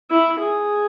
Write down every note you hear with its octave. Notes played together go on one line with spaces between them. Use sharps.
E4
G#4